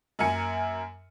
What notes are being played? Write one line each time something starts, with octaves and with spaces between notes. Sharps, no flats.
F#2 A#3 A#4 G#5 C#7